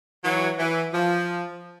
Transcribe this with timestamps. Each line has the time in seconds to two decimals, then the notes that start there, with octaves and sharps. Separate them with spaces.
0.24 E3 F#3
0.59 E3
0.94 F3